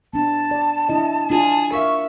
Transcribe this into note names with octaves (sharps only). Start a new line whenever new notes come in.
B3 D4 A5
D5
D4 E4 D#5
D4 F4 G#4
A#4 E5 F5 C#6